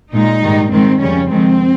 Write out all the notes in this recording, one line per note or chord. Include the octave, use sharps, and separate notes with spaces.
A#2 G#3 D#4
G#2 D#3 G3
G#2 D#3 G#3 C4
F2 C#3 G3 C#4
F2 D#3 G#3 C4